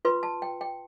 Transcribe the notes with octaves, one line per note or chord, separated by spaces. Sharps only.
F4 B4 C6
A5
G5
G5